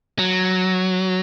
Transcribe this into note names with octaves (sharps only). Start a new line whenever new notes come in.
F#3